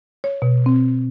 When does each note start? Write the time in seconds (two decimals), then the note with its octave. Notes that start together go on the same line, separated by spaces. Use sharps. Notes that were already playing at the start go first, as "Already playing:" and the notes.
0.24 C#5
0.42 B2
0.66 C4